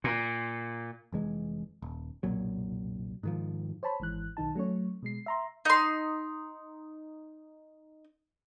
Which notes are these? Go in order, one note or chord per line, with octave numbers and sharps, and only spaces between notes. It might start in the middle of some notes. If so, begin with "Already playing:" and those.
A#2
F1 E3 G#3
D#1
F1 B1 A#2 F#3
G#2 D#3 F3
C5 C#5 A5 B5
G#1 G#2 E3 F#6
B1 D#3 D#4 A5
F#3 A3 C#4 C#5
B2 G#3 C7
E5 A#5 C6
D#4 C6